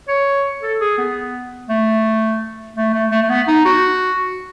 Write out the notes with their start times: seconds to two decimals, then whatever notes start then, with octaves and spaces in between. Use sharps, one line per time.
0.08 C#5
0.62 A4
0.81 G#4
0.98 B3
1.69 A3
2.76 A3
2.93 A3
3.11 A3
3.22 A3
3.29 B3
3.48 D#4
3.65 F#4